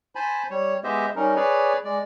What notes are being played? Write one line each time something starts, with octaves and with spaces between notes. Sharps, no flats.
C5 G#5 A5 B5
G3 C#5
G#3 B3 G4 C5 D#5 E5
G3 C#4 D#4 A#4
G#4 B4 C#5 D5
G#3 D5